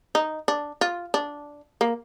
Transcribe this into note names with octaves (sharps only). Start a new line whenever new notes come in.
D#4
D4
F4
D4
A#3